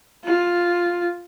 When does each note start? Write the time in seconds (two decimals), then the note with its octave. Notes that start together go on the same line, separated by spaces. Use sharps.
0.24 F4